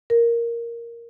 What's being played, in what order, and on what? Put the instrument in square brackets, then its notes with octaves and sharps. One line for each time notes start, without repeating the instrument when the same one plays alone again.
[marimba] A#4